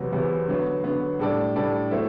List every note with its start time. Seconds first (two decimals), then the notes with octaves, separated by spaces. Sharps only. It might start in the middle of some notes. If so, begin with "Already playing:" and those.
Already playing: E2 C3 F#3 B3
0.12 E2 C3 F#3 B3
0.48 D3 F#3 B3
0.83 D3 F#3 B3
1.19 A2 G3 D4 A4 D5
1.55 A2 G3 D4 A4 D5
1.91 F#3 A3 C4 E4